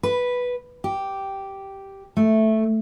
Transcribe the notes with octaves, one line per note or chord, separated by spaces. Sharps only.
B4
G4
A3